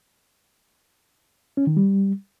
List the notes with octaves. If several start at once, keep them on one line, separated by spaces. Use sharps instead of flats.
C#4
D#3
G3